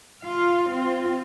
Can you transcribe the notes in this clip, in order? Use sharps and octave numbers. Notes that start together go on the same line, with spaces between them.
F4 F5
C4 F4